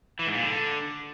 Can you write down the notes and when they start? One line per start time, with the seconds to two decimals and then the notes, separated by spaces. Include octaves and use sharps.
0.19 E3
0.27 G#2
0.35 A#2
0.42 D3